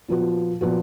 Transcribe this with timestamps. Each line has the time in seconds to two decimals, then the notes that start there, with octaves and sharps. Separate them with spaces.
0.08 A#2 F3 B3 F#4
0.61 A#2 F3 B3 F#4